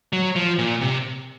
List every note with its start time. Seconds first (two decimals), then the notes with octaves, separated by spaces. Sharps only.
0.13 F#3
0.36 F3
0.58 A#2
0.81 C3